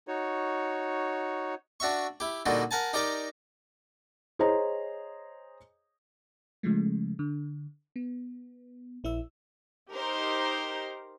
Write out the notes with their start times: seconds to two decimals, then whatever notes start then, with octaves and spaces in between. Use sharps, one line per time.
0.07 D#4 F#4 C#5
1.80 D4 F#4 E5 C#6
2.20 E4 G4
2.46 A#2 D3 G3 D#4 F#4
2.71 A#4 F#5 G#5 A5
2.93 D#4 G4 A#4 D5 A#5
4.39 G#4 C5 C#5 D#5 A#5
6.63 C#3 F3 G#3 A3
7.19 D3
7.96 B3
9.04 A#1 E4 E5 E6
9.93 D#4 G4 A#4 C5